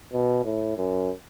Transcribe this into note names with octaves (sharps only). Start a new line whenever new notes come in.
B2
A2
F#2